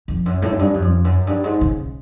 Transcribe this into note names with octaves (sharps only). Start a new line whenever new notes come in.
F2
F#2
A2
F#2
G2
F#2
F2
F#2
G2
G#2
C#3